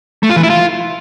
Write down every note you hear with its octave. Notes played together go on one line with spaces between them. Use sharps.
A3
F4
E3
E4
F4